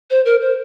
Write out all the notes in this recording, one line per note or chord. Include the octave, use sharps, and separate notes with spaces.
C5
A#4
C5